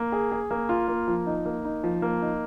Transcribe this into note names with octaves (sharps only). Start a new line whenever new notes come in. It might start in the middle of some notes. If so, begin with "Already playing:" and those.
Already playing: A#3
G#4
G#4
A#3
F4
A#3
F3
D#4
A#3
D#4
F3
A#3
D#4